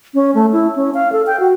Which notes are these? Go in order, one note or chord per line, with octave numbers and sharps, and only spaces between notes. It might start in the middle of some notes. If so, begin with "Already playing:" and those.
C#4
A3
E4
C#4
F5
A4
G5
F#4